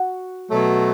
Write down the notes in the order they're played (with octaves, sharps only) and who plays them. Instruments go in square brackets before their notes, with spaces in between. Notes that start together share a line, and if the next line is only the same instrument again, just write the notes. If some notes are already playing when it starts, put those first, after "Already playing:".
Already playing: [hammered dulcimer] F#4
[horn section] B2 F#3 A3